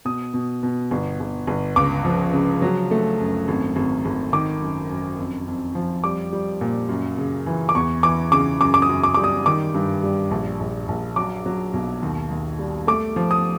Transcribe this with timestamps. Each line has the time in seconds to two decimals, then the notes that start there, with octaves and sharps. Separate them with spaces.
0.05 B2 D#6
0.34 B2
0.63 B2
0.91 G1
1.20 G1
1.47 G1
1.76 C#2 D6
2.05 F3
2.33 C#3
2.62 F#3
2.91 A3
3.19 F#2
3.48 G#1
3.76 G#1
4.05 G#1
4.33 D#3 D6
4.61 F#2
4.90 F#2
5.18 F2
5.47 F2
5.75 F3
6.04 G3 D6
6.32 G3
6.61 A#2
6.89 F#2
7.18 C#3
7.46 E3
7.69 D6
7.75 E2 C#6
8.03 E3 D6
8.32 C#3 D6
8.61 F#2 D6
8.74 D6
8.82 D#6
8.89 F#2
9.04 D6
9.14 G3 D6
9.24 D#6
9.46 D#3 D6
9.74 G2
10.03 G3
10.31 A#1
10.60 A#1
10.88 A#1
11.16 F#3 D6
11.46 F#3
11.74 B1
12.03 D#2
12.31 D#2
12.59 G3
12.87 A3 D6
13.16 F3
13.31 D#6